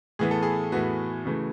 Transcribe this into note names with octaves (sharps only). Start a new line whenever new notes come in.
A2 E3 B3 G#4
A4
G#4
A2 E3 B3 F#4
C#3 E3 A3